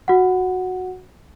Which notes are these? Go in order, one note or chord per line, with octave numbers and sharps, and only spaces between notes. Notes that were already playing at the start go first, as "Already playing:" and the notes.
F#4 F#5